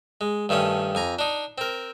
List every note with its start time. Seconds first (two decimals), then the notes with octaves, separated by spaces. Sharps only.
0.21 G#3
0.49 G2 D#3 A3 C#4 D#6
0.95 F2 G#5 A#5
1.19 D4 D#4
1.58 C4 A#4